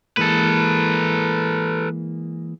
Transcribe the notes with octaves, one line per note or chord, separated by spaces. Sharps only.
E3 G#3 A#3 A4 B4